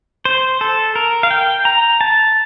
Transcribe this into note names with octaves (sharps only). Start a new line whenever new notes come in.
C5
A4
A#4
F5
G5
A#5
A5